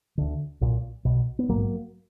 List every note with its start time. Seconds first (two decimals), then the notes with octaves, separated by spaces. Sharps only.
0.18 D2 D3
0.61 B1 A#2
1.05 B1 B2
1.39 B3
1.48 A#1 G#2 F#3 A#3